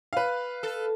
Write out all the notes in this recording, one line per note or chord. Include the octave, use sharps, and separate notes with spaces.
B4 F5
A4